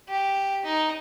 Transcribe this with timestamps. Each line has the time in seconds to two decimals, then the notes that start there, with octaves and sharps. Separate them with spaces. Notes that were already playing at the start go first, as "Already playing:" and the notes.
0.09 G4
0.65 D#4